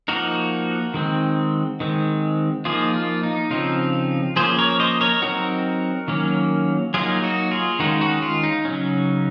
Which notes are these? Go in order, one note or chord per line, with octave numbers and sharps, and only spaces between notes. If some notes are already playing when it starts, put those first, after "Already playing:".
F3 A#3 D#4 F#4 A#4
D#3 G#3 C4
D#3 G#3 C4
F3 A#3 D#4 F4 G#4
F4
D#4
C#3 F3 C4 D#4 F4
F3 A#3 C#4 G#4 C5
A#4 C#5
C5 D#5
A#4 C#5
F#3 C4 D#4 F#4 A#4
D#3 F#3 A#3 C#4
F#3 A#3 D#4 F4 G#4
D#4 F#4
F4 G#4
D#3 G#3 C#4 D#4 F#4
D#4 F#4
F4
D#4
C#3 F#3 C#4